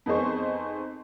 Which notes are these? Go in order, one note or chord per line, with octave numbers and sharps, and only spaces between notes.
F2 B3 D#4 G#4 C5 C#6